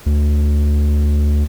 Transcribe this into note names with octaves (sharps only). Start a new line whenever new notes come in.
D2